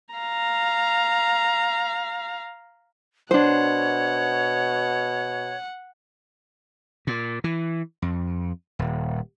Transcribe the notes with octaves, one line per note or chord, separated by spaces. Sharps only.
F5 A#5
B2 D4 C5 C#5 F#5
A#2
E3
F2
D#1